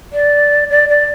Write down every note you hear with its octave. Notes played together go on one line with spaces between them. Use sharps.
D5
D5
D5